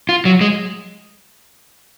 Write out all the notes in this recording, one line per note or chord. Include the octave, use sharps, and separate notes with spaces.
F4
F#3
G#3